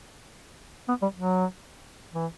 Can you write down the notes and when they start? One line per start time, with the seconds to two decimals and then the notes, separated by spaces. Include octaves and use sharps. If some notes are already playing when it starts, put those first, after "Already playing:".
0.89 B3
1.02 G3
1.16 F#3
2.14 E3